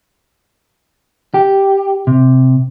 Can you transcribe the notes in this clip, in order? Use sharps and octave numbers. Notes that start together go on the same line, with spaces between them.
G4
C3